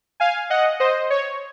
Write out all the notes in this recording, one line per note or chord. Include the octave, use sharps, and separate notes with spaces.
F5 G#5
D#5 F#5
C5 D#5
C#5